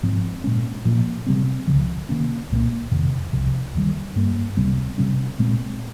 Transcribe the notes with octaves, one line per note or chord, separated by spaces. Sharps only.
G#2 F3 C4
A#2 G#3 C#4
A#2 F3 A#3
C3 G3 C4
C#2 C#3 F3
C3 D#3 A#3 C#4
C2 A#2 G3 A#3
F2 C3 D#3
C2 C3 F3
D#2 D#3 G3
G2 G3 A#3
C#2 C3 G3 C4
C3 G3 C#4
A#2 G#3 C4